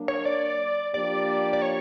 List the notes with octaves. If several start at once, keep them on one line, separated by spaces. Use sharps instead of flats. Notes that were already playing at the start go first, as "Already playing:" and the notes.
Already playing: F#3 A#3 D4
C#5
D5
F3 A#3 D4 G4 D5
D5
C#5